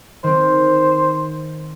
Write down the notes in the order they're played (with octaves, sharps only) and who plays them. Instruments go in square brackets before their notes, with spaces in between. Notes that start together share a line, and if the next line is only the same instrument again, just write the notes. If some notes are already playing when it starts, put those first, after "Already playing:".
[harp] D#3 C4 [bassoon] C5